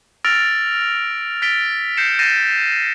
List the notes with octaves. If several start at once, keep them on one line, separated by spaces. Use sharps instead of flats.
E6 F6 A6 A#6 D7 F7
A6 B6 D7 G7
G6 A#6 C7 C#7 E7
G6 A6 A#6 C7 D#7 E7